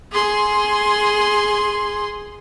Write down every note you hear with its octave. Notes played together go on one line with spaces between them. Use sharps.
G#4 C6